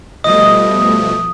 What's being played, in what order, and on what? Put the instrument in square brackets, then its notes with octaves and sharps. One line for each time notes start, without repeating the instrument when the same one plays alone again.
[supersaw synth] B2 F3 A3 [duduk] G3 [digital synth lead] D#5 [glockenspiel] D#6